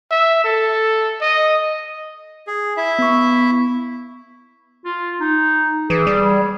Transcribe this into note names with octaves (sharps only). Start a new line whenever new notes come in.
E5
A4
D#5
G#4
E4 E5
B3 C#6
F4
D#4
E3 G#4
G3